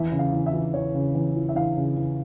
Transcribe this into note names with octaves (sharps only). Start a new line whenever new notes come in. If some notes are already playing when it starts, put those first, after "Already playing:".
Already playing: E2 E5
C#3
F5
E2
E5
E3
E2 C#5
C#3
E2
E3
E5
E2 F5
C#3
E2